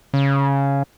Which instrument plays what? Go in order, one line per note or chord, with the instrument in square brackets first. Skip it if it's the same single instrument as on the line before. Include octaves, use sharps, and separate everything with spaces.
[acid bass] C#3